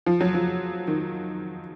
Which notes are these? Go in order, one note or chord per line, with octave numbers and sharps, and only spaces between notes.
F3
F#3
F3
D#3